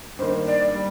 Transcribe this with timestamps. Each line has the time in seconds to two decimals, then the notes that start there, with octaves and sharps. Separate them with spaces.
0.19 G2 D#3 A#3 C5
0.47 D5
0.75 G3